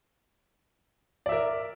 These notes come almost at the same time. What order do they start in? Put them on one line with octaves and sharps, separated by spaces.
D5 E5 A#4